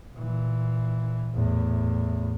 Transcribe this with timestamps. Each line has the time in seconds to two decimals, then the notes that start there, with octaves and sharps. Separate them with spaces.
0.14 A#2 E3
1.35 E2 A2